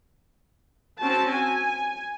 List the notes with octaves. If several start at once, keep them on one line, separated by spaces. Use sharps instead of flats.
C4 C#4 F#4 A5
G#5